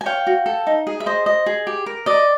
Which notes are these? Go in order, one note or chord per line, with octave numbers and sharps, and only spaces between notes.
G#5
C#5 F5 G5
F#4
A4
D#4
G#4
E5
C5 D#5
D#5
G#4
G4
A#4
D5 D#5